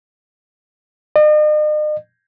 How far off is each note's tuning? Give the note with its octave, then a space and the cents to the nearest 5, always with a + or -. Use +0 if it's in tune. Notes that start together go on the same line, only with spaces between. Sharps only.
D#5 -45